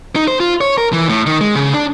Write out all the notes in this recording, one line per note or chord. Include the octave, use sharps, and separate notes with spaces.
D#4
C5
F4
C#5
A#4
E3
A2
D#3
G#3
C#3
D4